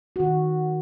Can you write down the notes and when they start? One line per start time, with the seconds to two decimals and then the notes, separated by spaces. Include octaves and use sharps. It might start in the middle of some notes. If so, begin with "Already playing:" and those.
0.16 D#3 F#4